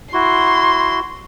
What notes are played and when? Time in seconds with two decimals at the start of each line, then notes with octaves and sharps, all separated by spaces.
0.13 E4 F#4 C6